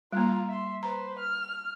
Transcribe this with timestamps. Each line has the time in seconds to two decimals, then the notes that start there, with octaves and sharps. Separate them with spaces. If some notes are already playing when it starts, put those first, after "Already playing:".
0.13 G3 A#3 F4 A#5
0.48 E5 C6
0.83 B4 C5 A#5
1.19 F6